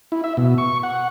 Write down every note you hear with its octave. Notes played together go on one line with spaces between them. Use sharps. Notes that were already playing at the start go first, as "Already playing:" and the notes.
E4
E5
B2
C#6
F#5